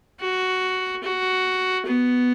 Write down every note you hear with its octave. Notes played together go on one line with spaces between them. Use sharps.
F#4
F#4
B3